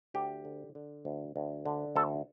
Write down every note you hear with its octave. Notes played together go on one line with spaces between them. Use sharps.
D2 G4
D3
D3
D2
D2
D3
D2 A4